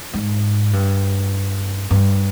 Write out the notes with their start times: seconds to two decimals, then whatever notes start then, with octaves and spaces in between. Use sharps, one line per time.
0.13 G#2
0.73 G2
1.91 G2